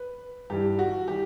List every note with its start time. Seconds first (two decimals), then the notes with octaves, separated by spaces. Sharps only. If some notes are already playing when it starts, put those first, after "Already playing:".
Already playing: B4
0.50 G2 E3 G3 G4
0.79 F#4
1.08 E3 G3 G4